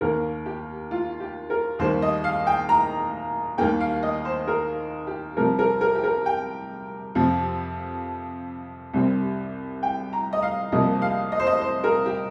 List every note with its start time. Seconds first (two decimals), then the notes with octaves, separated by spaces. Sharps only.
0.01 D#2 D#3 A#3 A#4
0.46 G4
0.91 F4
1.20 G4
1.50 A#4
1.79 D#2 D#3 G3 A#3 C5
2.02 D#5
2.24 F5
2.47 G5
2.69 A#5
3.58 D#2 D#3 G3 A#3 G5
3.80 F5
4.03 D#5
4.25 C5
4.47 A#4
5.07 G4
5.37 C2 C3 F3 A#4
5.59 A#4
5.81 A#4
5.95 G4
6.04 A#4
6.26 G5
7.15 F2 C3 F3
8.93 C2 C3 G3 C4
9.83 G5
10.13 A#5
10.33 D#5
10.42 F5
10.72 C2 C3 F3 A#3 D#5
11.02 F5
11.32 D#5
11.39 C5
11.47 D#5
11.61 C5
11.84 A#4
12.06 G4